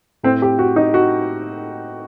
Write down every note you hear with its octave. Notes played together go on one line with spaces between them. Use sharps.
A2 C4
G4
F#4
D#4
F#4